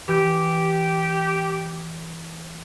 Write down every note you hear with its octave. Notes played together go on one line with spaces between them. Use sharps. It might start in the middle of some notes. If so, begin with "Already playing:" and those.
E3 G4